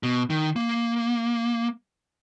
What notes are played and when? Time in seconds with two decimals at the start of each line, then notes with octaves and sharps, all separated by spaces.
0.03 B2
0.30 D#3
0.56 A#3